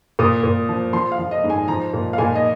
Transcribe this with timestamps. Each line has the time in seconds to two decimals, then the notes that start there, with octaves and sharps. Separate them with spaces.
0.19 A#2 D#6
0.43 A#2
0.69 F3
0.93 F3 C6
1.12 F5
1.19 F3
1.31 D#5
1.44 G#2
1.50 G#5
1.68 F3 A#5
1.93 A#2
2.13 F5
2.18 A#2 G#5
2.35 D#5